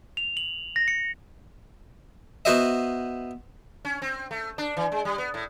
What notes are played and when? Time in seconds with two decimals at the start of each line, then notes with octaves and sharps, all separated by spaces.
0.17 F7
0.37 F#7
0.76 A#6
0.88 C#7
2.45 B3 F#4 C5 D#5 E5
3.85 C#4
4.02 C4
4.31 A3
4.58 D4
4.77 E3
4.92 G#3
5.05 G3
5.18 B3
5.34 A2